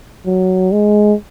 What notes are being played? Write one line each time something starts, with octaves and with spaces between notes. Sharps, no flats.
F#3
G#3